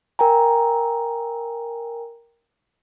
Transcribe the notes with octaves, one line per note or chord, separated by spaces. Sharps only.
A#4 G5 G#5 A#5